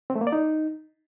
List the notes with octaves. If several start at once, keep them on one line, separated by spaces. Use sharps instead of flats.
C4
A3
A#3
D5
D#4